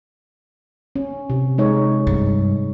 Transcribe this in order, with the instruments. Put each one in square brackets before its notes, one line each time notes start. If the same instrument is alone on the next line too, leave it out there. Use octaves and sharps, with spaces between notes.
[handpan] C#4
C3
G#3 D#4 C#5
[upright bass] G2